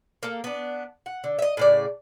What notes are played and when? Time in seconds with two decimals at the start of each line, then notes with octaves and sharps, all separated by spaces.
0.23 A#3 A4
0.44 B3 D4
1.06 F#5
1.24 D3
1.39 D#5 E5
1.57 A2 C#3 D5